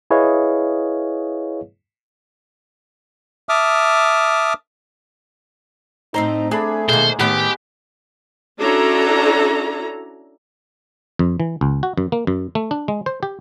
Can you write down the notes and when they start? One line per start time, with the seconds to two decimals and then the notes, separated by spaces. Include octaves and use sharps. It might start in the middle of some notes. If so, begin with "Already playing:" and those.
0.11 E4 G#4 B4 C#5 D#5 F5
3.49 E5 A5 D6 D#6 F6
6.14 A2 C4 D#4 C5 A#5
6.51 A3 D4 G#4 B5
6.89 B2 D#3 G#3 A#3 C5
7.20 A2 D#3 B3 G4 B4
8.60 C#4 D4 E4 F#4 A4 A#5
11.19 F2
11.40 E3
11.61 C#2
11.83 F#4
11.98 F#2
12.12 A#3
12.27 F#2
12.55 A3
12.71 D4
12.88 G#3
13.06 C5
13.23 G4